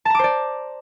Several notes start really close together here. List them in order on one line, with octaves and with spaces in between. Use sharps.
A5 A#5 D6 C5 D5